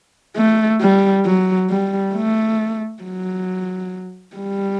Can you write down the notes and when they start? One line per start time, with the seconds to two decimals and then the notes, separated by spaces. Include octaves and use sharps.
0.37 A3
0.81 G3
1.26 F#3
1.70 G3
2.14 A3
3.03 F#3
4.36 G3